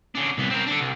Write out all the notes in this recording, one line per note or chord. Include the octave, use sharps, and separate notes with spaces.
C#3 D4
C2 B3
C4 A#4
D4 A4
C2